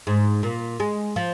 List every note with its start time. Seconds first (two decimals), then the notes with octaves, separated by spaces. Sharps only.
0.07 G#2
0.43 A#2
0.80 G#3
1.16 F3